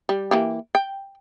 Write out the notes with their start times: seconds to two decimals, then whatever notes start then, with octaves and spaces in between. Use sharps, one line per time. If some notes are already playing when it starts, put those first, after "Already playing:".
0.09 G3
0.31 E3 A#3 G4
0.75 G5